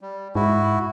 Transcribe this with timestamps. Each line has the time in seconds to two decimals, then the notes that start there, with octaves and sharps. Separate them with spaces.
0.01 G3
0.35 G#2 E4 F#4